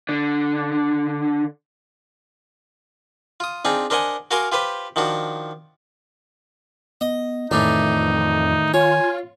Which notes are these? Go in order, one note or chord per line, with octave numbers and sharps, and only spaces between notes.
D3 D4
F4 D#6
C4 D4 D#4 F4 G#4
D4 A#4 C5 D#5 F#5 G#5
F#4 A#4 F5 G#5 C6 D6
F4 G4 B4 C5
D#3 F3 D4 F#4
B3 D#5
F2 A2 D#3 E3 D4 D#4
F4 C#5 G#5